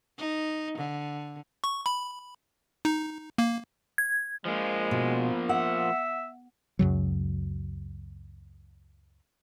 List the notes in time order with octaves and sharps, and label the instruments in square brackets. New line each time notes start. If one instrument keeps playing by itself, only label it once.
[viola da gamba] D#4
D3
[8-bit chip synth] C#6
B5
D#4
A#3
[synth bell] G#6
[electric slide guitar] F3 A#3 [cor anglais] G#3
[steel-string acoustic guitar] B2
[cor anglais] E5 [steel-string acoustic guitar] F#5
[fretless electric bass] C#2 F#2 C#3 F#3